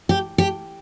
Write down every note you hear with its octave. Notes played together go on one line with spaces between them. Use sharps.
G4
G4